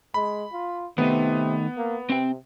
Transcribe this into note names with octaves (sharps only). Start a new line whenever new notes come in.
G#3 B5
F4
C3 D#3 A3 B3 D#4
A#3
C3 C4 G5